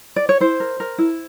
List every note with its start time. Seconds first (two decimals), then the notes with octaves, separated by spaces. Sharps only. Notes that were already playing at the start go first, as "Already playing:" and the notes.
0.16 D5
0.29 C#5
0.40 E4 C5
0.60 A#4
0.80 A#4
0.98 E4